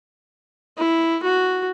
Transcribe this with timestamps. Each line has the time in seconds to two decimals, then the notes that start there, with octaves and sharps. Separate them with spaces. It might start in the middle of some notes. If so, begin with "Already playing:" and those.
0.78 E4
1.23 F#4